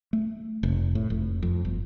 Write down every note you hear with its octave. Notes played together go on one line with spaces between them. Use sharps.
A3
F1
A2
F1
F2
G1